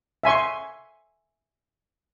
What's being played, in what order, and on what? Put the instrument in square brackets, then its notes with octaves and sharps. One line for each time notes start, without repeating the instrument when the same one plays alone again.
[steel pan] E5 G#5 C6 C#6